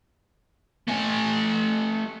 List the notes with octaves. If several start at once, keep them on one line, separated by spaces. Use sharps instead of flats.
A3 G#5